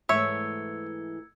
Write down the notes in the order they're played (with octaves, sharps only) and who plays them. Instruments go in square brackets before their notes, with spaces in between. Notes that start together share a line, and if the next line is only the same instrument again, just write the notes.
[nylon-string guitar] G#2 E3 A3 [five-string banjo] C#5 E5 [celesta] E6 G#6 C#7